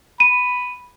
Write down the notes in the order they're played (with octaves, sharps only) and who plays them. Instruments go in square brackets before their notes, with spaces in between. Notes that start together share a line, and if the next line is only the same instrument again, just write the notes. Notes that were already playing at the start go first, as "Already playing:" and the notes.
[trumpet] B5 [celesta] D#7